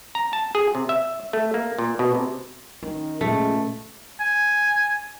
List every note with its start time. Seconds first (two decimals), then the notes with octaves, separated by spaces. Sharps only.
0.15 A#5
0.33 A5
0.55 G#4
0.75 C3
0.89 E5
1.33 A3
1.54 A#3
1.78 A#2
1.99 B2
2.14 C3
2.83 D#3 C#4
3.21 C#2 A#2 G#3 A3
4.20 G#5